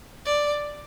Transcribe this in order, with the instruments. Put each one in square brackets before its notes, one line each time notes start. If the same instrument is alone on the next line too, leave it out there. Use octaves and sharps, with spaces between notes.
[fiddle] D5